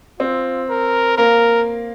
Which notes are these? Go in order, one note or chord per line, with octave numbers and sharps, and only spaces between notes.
C4 F4
A#4
A#3 A#4